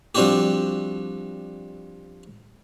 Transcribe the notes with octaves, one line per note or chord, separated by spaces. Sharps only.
F3 G3 C4 D4 F#4 G4